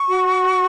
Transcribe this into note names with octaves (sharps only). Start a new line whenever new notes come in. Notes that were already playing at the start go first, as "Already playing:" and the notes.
Already playing: C#6
F#4